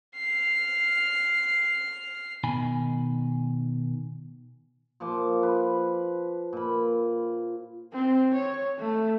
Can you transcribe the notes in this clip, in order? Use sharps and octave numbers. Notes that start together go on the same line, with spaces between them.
F6 C7
B2 D#3 G#5 B5
A#2 F3 C6 D6
B4
A#2 B5
C4
C#5
A3